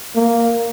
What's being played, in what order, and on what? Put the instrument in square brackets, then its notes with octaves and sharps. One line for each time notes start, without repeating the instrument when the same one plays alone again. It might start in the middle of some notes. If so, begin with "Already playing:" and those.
[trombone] A#3